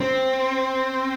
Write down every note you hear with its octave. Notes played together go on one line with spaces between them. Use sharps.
C4